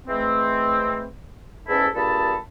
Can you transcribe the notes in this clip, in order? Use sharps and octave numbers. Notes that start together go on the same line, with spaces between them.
E3 G#3 A3 C4
E2 G#2 C#4 E4 A4
G2 A#2 G#4 A4 A5 B5